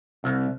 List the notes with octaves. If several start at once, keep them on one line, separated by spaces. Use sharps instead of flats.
C2